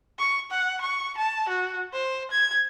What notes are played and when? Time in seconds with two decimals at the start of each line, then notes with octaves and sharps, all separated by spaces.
0.19 C#6
0.51 F#5
0.81 C#6
1.17 A5
1.49 F#4
1.93 C5
2.31 G#6